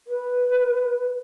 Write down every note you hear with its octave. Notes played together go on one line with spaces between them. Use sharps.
B4